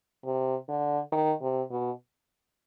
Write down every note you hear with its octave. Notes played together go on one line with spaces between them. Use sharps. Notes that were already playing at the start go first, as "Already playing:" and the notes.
C3
D3
D#3
C3
B2